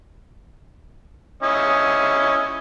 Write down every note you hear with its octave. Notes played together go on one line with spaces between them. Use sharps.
C#4 E4 D#5